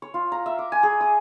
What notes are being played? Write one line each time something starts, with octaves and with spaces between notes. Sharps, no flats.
C#5
F4
A#5
E5
D6
G#5
G#4
D#6